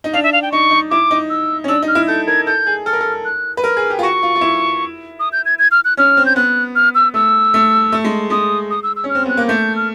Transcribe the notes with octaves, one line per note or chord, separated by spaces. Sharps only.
D#4
D4 F5
E5
F5
G5
D#4 C#6
D#4
E4 D6
D#4
E6
C#4
D4 E6
D#4
F6
E4
A4 G6
A#4 G#6
A4 G6
G#4
A4 F6
A#4
A4
F#6
B4
A#4 F6
G#4
G4
F4
F#4 C#6
F4
F4
E4
D#6
G6
G#6
G#6
F6
F#6
C#4 F6
C4
G6
B3 F#6
F6
E6
A3 E6
A3
A3
G#3
G#3 D#6
D#6
E6
E6
C#4
F6
C4
B3 F#6
A#3
A3 G6
F6